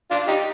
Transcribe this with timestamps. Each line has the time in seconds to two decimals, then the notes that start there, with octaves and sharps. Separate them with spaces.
0.10 D4 F4
0.28 D#4 G4